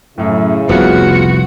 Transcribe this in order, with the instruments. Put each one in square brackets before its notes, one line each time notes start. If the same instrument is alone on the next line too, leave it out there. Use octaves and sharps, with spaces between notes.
[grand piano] F#2 A2 [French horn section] C#3 E4
[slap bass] F1 C2 F2 [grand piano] B3 F4 [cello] F#4